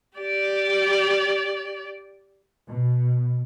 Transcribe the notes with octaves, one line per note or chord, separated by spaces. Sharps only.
G4 D5
B2